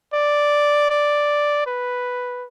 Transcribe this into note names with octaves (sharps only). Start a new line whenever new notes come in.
D5
D5
B4